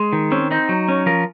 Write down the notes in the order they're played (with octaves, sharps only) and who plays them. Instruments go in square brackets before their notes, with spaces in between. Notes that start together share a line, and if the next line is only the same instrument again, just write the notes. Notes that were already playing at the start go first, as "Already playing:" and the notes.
Already playing: [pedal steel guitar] G#3
D#3
C4 C#4
C4 D#4
F#3
C#4
F3 A#4